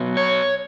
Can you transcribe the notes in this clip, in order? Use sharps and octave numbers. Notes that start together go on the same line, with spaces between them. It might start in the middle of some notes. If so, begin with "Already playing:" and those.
Already playing: B2 F#3 B3
C#5